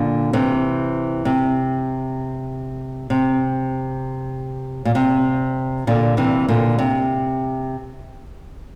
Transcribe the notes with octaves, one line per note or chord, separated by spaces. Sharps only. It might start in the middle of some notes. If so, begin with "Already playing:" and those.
Already playing: A#2 D3
C3 E3
C3
C3
A#2
C3
A#2 D3
C3 E3
A#2 D3
C3